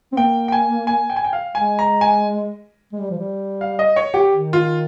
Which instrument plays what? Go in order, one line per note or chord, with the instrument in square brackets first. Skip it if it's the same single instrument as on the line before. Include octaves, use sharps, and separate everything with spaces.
[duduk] C4
[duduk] A#3 [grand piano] G5
[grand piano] G5
G#5
G#5
G5
G#5
G5
F5
[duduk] G#3 [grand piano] G#5
[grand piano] A#5
G#5
[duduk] G#3
G3
F3
G3
[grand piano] F5
D#5
C#5
G4
[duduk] D#3
[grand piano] F4